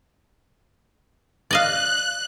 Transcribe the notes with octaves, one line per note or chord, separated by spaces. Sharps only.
D5 D#5 F5 F#6